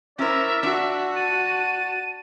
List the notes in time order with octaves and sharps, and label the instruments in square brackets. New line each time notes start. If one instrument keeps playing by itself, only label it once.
[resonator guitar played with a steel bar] C#4 C5 [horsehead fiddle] E4 A#4 [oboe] D5 [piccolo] E5
[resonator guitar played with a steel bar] D4 [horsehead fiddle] F#4
[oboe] A5 [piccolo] D#7